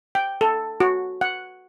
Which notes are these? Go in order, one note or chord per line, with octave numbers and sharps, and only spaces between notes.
G5
A4
F#4
F#5